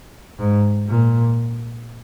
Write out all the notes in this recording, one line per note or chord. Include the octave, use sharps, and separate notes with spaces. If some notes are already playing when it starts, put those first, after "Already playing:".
G#2
A#2